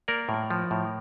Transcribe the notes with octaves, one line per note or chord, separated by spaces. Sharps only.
A#3 A#4 D5
A2
F3
A2